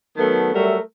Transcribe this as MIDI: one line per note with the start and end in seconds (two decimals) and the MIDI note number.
0.17 0.53 51
0.17 0.53 54
0.17 0.53 57
0.17 0.53 59
0.17 0.53 69
0.54 0.79 54
0.54 0.79 55
0.54 0.79 57
0.54 0.79 70
0.54 0.79 76